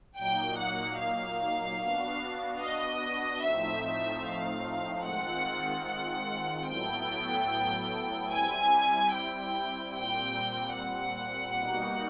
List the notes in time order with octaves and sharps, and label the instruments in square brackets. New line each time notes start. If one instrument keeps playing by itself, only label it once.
[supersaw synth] A#2 F#3 A#3 D#4 [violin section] G5
[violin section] F#5
F5
[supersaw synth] B3 D4 F#4
[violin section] D#5
[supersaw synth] A2 F3 A3 C4 D#4 [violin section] E5
[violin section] F5
[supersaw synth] D#3 G#3 C4 F4 [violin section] F#5
[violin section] F#5
[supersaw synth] A2 F#3 B3 E4 A4 [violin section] G5
[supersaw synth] G3 C4 E4 [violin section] G#5
[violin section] G5
[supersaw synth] A#2 G3 C4 [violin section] G5
[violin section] F#5
[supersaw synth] B2 G3 A#3 D#4 F#4